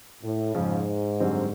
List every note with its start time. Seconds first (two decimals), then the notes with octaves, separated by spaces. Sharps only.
0.23 A2
0.55 F2 G#2 C#3 F3
1.20 F#2 D3 G3 C4